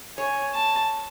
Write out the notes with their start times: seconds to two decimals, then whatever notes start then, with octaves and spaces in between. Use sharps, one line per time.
0.17 C#5 G#5
0.53 A5